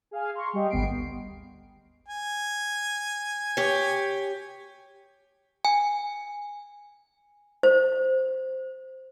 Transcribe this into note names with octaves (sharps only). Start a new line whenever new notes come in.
G#4 F5 G#5
A#5 C6 C#6
G3 G4 D#5
G#1 D2 B3 C7 D7
G#5
G4 C#5
G#5
C5